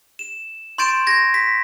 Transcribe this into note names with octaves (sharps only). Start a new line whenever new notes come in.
E7
C6 C#6 G6 A6 D7 E7
G#6 A#6
B6